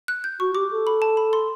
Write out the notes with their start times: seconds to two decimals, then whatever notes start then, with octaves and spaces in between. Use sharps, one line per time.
0.08 F#6
0.24 G6
0.40 F#4 C#6
0.54 G4 D6
0.71 A4
0.87 B5
1.02 A5
1.17 B5
1.33 C6